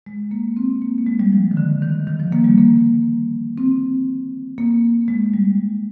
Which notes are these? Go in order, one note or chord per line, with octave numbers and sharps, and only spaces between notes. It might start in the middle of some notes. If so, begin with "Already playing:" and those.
G#3
A#3
C4
A#3
A#3
G#3
G3
F3
D#3
D3
D#3
D#3
F3
A#3
G3
A#3
C4
A#3
G#3
G3